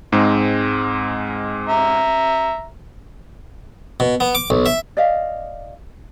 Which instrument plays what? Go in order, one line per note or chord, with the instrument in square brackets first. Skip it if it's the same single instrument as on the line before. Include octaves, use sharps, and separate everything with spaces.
[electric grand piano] G#2 G#3 C4
[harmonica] E5 A#5
[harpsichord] B2
B3
D6
B1
E5
[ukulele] D5 D#5 F5